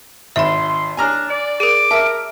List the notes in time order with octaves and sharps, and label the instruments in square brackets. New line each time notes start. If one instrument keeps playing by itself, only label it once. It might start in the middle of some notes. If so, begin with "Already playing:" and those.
[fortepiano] G#1 [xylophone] E5 B5 [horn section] C6
[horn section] D4 [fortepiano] G#5 A#5 F6
[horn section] D5
[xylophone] G#4 A#4 [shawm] D6
[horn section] A#4 [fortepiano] E5 [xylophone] A5